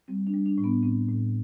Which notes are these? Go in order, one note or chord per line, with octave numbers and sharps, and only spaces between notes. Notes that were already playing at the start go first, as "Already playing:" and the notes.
G3 C4
D4
G3
D4
A2
B3
A2 C4
A2